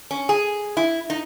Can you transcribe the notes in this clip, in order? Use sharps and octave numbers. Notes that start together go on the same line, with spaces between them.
C#4
G#4
E4
D#4